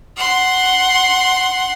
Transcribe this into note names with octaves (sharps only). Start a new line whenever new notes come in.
F#5 C6